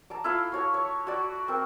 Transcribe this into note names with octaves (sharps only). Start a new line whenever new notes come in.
A5 A#5 D6
E4 F4 A4 F5
F#4 C#5 A5
C#5
F#4 D5
C4 A#4